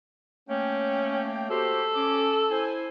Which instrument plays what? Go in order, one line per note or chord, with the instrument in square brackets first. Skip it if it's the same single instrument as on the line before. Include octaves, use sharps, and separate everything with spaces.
[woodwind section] A3 A#3 G5 [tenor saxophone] C#4
[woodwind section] F#4 G4 C5 [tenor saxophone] A4
[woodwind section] C#4 D6
E4 C5 G#5